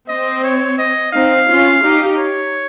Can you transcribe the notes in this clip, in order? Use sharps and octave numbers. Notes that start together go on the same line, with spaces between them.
C4 D#5
C#5
D#5
C4 D#4 F5
C#4 F4
D#4 G4
C#5